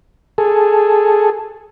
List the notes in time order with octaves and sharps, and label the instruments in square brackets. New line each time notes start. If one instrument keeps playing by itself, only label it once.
[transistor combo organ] G#4 A4